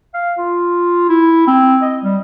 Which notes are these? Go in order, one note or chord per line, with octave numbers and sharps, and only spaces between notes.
F5
F4
E4
C4
D#5
G3